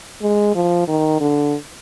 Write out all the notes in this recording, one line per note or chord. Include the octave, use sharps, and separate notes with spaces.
G#3
F3
D#3
D3